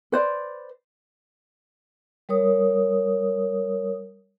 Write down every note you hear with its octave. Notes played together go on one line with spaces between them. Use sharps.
B4 C5 D5
G3 A#4 C#5 D#6